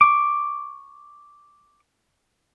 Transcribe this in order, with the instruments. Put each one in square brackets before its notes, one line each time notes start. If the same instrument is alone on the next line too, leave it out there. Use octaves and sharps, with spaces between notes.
[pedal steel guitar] C#6 D6